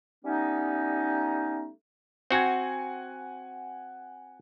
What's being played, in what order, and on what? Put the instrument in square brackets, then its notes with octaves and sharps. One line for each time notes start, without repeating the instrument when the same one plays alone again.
[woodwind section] G3 A3 B3 C#4 D#4
[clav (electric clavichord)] C4 F#4 [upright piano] F#5 G#5 G#6